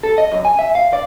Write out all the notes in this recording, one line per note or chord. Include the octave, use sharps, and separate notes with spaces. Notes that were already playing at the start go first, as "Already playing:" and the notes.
A4
D#5
F#2
G#5
E5
F5
D5